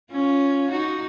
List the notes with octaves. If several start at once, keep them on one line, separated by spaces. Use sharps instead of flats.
C#4 F4
D#4 F#4